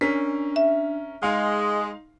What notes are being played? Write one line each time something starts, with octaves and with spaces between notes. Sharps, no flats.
C#4 D4 A#4 B6
E5
G#3 D#4 F5 C6